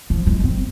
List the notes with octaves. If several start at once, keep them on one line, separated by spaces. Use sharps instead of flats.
F3
G#3
C4